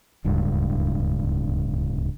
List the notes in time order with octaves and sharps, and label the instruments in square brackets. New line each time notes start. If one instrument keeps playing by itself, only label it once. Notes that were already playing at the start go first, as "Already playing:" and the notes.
[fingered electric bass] D1 C#2 G2